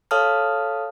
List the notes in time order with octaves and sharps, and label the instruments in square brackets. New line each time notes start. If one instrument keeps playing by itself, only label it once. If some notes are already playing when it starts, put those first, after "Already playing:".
[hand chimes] A4 C#5 F5 A5 D#6 F6